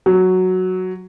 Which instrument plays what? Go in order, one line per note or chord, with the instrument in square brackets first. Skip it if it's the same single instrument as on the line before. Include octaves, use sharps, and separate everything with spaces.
[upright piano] F#3